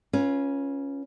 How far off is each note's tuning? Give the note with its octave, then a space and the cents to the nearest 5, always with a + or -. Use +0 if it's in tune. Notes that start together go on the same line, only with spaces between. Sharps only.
C#4 +0 F4 +0 B4 -30